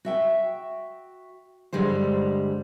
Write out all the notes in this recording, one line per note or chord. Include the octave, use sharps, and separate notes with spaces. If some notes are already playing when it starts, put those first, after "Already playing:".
F#4 E5 G5
G2 D3 G3 G#3 G4 C5